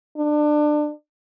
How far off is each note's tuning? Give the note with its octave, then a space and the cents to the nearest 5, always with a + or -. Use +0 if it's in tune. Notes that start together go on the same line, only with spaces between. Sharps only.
D4 +25